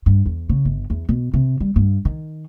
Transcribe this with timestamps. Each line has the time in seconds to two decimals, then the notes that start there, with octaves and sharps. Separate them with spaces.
0.06 G2
0.26 E2
0.49 C#3
0.65 G1
0.90 E2
1.09 B2
1.34 C3
1.60 G3
1.76 G2
2.05 D#3